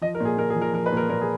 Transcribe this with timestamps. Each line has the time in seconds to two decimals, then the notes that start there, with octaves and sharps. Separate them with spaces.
0.01 F3 D#5
0.15 A#4
0.20 A#2 G#4
0.38 A#2 A#4
0.50 G#4
0.55 F3
0.61 A#4
0.73 F3 A#4
0.86 B4
0.92 A#2 A#4
1.10 A#2 A#4
1.21 G#4